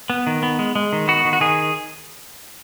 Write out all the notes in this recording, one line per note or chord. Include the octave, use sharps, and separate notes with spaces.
B3
D#3
B3
G#3
G#3
D#3
B3 F#4
D#3
F#4
D#3 G#4